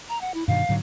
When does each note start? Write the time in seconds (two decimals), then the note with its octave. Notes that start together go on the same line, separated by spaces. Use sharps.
0.09 A#5
0.21 F#5
0.34 E4
0.48 G2 B2 D#3 F5
0.69 G#2 D3 F#3